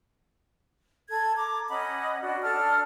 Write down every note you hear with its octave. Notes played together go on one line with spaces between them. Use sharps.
A4 G#6
A#5 D6
C#4 D#5 F#5 B5
D4 F#4
D4 A4 A5 F6